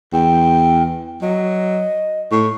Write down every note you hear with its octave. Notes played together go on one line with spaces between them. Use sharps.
E2 G5
F#3 D#5
A2 C#6